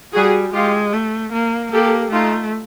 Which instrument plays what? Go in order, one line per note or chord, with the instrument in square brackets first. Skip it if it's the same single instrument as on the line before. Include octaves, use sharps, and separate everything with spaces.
[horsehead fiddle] G3 [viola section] F#4 G#4
[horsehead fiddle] G#3 [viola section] F4 G4
[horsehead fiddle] A3
A#3
[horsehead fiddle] A#3 [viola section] G4 A4
[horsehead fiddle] A3 [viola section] D#4 F4